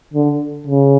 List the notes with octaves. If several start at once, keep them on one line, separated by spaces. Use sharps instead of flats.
D3
C#3